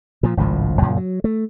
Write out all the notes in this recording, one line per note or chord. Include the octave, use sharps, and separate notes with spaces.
A#2 F3
G#1 C#2 A2 F3
F#2 A#2 C#3 F3
F#3
A3